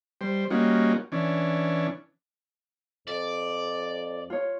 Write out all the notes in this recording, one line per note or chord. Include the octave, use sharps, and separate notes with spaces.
G3 C5
G3 A#3 C#4 D#4 F4 F#4
E3 C#4 D4
F2 D5
F4 C#5